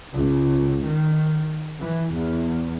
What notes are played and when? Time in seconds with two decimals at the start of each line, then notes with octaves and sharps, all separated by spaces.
0.13 C#2
0.86 D#3
1.81 E3
2.12 E2